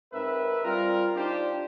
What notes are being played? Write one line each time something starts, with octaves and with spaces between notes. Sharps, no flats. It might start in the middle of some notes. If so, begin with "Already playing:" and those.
G#2 C4 A#4 B4 E5
G3 C4 F4 A#4
D4 D#4 F4 G4 C5 D5